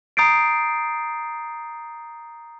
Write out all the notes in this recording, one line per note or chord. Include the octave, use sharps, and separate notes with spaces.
A#5 D#6 G6 A6 C7 D7